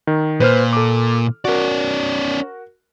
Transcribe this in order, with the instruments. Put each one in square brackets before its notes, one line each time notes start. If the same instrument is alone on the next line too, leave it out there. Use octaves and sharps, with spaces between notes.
[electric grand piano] D#3
[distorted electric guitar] A#2 [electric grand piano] B4 C5 F6
[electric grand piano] A4 D6
[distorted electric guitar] C#4 D5 [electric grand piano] F#4 A#4